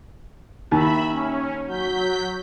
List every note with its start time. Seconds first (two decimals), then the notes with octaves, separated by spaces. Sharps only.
0.71 D#2 E5 B5
1.11 C#4
1.66 F#3 G6 B6